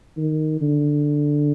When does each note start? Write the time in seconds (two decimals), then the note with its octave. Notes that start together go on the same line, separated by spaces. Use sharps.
0.17 D#3
0.61 D3